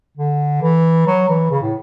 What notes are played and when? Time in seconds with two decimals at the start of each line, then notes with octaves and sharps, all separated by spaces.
0.17 D3
0.62 E3
1.07 F#3
1.29 E3
1.51 C#3
1.62 A2